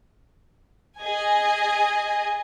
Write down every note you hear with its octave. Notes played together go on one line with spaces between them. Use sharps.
G#4 D#5 G#5